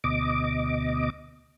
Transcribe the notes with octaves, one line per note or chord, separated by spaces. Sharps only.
D2 B2 D#5 D6